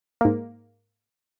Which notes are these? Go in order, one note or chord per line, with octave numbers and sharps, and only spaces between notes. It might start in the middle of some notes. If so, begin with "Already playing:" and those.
G#2 A#3